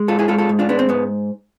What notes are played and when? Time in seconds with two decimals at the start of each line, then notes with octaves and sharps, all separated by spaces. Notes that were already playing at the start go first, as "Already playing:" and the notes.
Already playing: G#3
0.08 G#2 F4 A4
0.19 E4 G#4
0.28 G#3 F4 A4
0.38 F4 A4
0.49 G#2
0.59 D4 F4
0.69 G#3 B3 D4
0.79 C4
0.89 G#2 B3